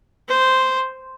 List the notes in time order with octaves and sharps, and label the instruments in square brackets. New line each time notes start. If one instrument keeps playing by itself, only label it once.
[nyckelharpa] C5